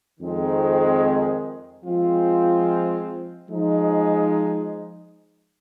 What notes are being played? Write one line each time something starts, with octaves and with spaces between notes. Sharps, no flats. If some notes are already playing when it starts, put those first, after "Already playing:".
F2 D#3 G#3 C4
F3 G#3 C4 F4
F3 G#3 D#4